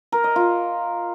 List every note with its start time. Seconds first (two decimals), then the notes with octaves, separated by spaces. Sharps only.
0.12 A#4
0.24 D#5
0.36 F4